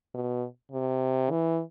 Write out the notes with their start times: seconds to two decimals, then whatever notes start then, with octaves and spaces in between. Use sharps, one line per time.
0.14 B2
0.72 C3
1.31 E3